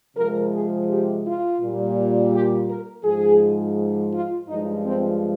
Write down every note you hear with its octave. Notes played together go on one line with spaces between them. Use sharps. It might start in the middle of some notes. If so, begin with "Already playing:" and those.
C3 F3 G#3 A#4
G#4
G4
F4
A#2 G3
G4
A#4
G#2 F3 G#3 G#4
F4
G2 F3 G#3 D#4
C4